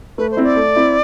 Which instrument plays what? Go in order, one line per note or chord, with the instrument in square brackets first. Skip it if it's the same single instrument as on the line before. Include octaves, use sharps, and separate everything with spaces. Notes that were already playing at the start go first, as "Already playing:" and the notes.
[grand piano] A3 [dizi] B4
[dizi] C5
[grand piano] C4 E4
[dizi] D5
[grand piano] A3
C4 E4